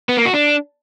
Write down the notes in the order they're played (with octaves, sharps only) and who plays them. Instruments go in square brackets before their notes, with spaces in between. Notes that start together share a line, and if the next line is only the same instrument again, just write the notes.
[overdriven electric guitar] B3
A#3
F#4
D4